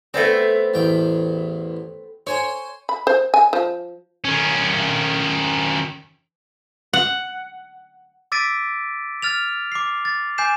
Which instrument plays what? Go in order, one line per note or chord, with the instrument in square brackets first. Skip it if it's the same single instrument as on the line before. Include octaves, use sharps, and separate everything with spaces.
[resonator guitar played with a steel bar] A3 B3 C4 [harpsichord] D5
[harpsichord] A1 E2 G5
[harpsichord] C5 G#5 [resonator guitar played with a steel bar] C#5
[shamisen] B5
C5
G#5
F3
[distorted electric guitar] D#3 C#4
[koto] F#5
[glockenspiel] D6 E6 A6 B6 D7 D#7
F6 A6 F7
D6 C7
A6
G#5 D6 G6 C7 E7